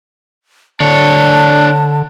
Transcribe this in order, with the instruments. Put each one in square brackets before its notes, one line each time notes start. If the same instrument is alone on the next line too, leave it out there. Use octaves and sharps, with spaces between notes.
[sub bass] D3 [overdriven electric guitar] D4 C#5 [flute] A5